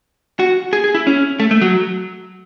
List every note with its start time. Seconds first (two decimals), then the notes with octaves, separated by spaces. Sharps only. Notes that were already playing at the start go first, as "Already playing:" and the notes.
0.39 F#4
0.73 G#4
0.84 G#4
0.95 E4
1.07 C#4
1.40 A3
1.51 A3
1.61 F#3